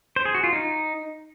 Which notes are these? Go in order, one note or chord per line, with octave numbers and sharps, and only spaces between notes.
C5
G#4
F#4
F4
D#4